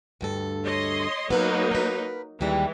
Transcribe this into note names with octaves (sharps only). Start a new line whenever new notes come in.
D2 G2 A4
C#5 D#5 C6
F#3 A#3 B3 D#4 B4
A#4 B4
D#2 E3 G3 G#3